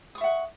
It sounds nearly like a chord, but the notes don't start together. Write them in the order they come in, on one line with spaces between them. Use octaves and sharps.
D#6 C#6 E5 F#5